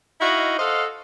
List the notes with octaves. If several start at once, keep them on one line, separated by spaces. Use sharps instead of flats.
D#4 E4 F#4 D#5 F5
A4 C5 D#5 F5 F#5